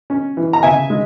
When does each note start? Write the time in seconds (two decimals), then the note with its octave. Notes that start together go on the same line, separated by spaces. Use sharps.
0.10 C#4
0.37 E3
0.53 A#5
0.63 C#3 E5 G#5
0.90 G#3